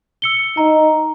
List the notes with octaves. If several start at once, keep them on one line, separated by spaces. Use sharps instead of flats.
E6 C#7 G7
D#4 A#5